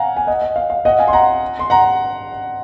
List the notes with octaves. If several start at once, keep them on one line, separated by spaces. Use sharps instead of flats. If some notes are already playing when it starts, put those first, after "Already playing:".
Already playing: F5 F#5 G#5 A#5
G#5
D#5 F#5
D#5
F5
F5
D#5 F#5
F5 G#5
C6
F#5 A#5
C6
F#5 A#5